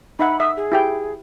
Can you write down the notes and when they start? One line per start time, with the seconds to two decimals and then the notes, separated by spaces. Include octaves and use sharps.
0.19 D#4 E5 F#5 B5
0.40 E5 D#6
0.57 G#4
0.72 E4 G4 G5